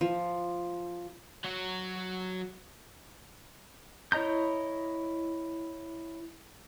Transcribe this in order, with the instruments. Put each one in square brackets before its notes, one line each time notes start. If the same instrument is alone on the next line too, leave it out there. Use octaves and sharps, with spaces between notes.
[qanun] F3
[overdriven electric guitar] F#3 F#4
[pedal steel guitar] E4 C#5 D#5 A#5 G6